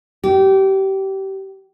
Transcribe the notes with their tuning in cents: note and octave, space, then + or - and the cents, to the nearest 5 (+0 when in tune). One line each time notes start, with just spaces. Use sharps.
G4 -25